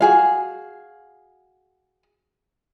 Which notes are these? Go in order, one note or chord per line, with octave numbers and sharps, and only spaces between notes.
F#4 G#4 F5